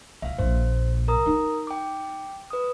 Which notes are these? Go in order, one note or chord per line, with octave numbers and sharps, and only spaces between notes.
C#2 E5 F5
A#1 A#2 C5
A#4 A#5 D#6
D#4
G5 D6
B4 D#6